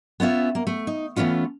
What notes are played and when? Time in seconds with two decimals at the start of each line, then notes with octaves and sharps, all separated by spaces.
0.20 B3 C#4 F4 E5
0.55 A#3
0.67 A3
0.87 D#4
1.16 E3 A3 B3 C#4 F4